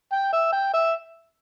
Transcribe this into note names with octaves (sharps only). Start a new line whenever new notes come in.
G5
E5
G5
E5